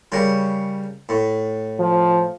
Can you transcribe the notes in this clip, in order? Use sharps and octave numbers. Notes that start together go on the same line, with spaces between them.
C#3 G3 A#4
A2
F3